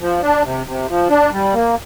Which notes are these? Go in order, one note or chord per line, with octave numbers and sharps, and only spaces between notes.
F3
D4
C3
C3
F3
D4
G3
A#3